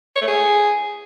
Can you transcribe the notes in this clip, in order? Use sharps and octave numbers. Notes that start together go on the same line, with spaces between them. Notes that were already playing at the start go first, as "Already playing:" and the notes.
C#5
A3
G#4